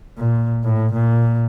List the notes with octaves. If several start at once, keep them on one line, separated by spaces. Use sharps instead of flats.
A#2
A2
A#2